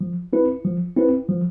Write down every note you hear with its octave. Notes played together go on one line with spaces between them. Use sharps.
F3
C4 E4 B4
F3
C4 E4 B4
F3